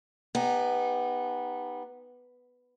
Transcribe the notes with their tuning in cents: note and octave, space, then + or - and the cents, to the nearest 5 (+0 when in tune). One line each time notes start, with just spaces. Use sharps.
B3 +0 D#4 +0 G4 +30